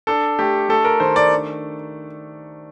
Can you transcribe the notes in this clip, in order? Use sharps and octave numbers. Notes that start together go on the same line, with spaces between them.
D4 A4
A3 G4
A3 A4
A#4
D#3 C5
D5
D4